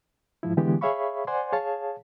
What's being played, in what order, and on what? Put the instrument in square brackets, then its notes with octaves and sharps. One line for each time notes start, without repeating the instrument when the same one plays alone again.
[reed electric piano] G#2 F3 E4
D3 E3 G#3 B3 G4
G#4 C#5 E5 F5 B5 C#6
C5 D5 F#5 G#5 C6
G#4 C#5 F5 A5